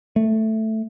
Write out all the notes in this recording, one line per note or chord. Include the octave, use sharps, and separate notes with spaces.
A3